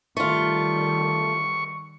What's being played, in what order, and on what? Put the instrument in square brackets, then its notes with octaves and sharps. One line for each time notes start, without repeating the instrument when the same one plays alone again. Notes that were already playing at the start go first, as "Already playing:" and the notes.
[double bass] D#3 G3 [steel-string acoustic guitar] A3 F4 [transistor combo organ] C#6